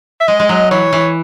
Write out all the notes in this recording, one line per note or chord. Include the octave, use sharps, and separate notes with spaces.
E5
G#3 D#5
G#3
F#3
E3 C#5
E3